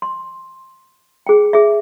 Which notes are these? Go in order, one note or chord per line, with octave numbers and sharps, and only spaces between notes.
C6
G#4 G5
G#4 E5